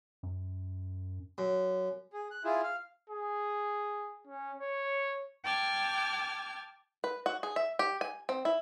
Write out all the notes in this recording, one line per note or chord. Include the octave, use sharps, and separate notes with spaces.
F#2
F#2
G#4
F#6
E4 F4 G#4
F5
G#4
C#4
C#5
G5 A5 D6 F6 G#6
B4
F#4
G#4
E5
G4
G#5
C4
E4